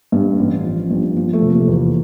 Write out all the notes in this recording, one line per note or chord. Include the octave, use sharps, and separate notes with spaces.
G2
A1
F3
G2
F3
A3
F1
A#3
E2